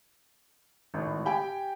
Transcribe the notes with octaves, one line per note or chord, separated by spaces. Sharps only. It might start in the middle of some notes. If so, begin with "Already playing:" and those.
G#1 A2
G4 G5 G#5